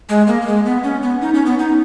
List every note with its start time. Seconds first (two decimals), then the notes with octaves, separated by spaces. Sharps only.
0.09 G#3
0.27 A#3
0.42 A#3
0.46 G#3
0.65 B3
0.83 C#4
1.02 B3
1.21 D#4
1.34 C#4
1.46 B3
1.59 D#4